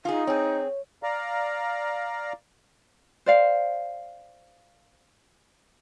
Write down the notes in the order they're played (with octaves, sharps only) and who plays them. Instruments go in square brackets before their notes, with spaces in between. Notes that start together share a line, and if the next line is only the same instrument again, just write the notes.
[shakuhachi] D#4 [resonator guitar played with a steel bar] F4 G#4
[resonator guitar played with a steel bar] C4 G#4 [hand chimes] C#5
[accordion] D5 F5 A#5
[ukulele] C5 D5 F5